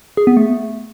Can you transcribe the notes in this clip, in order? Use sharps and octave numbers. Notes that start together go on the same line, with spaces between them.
G#4
B3
A3